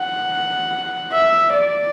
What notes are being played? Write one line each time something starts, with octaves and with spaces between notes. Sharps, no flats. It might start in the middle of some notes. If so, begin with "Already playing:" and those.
Already playing: F#5
E5
D5